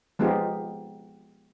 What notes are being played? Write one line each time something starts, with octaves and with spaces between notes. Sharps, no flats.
F3 G#3 B3 D#4 F4 G4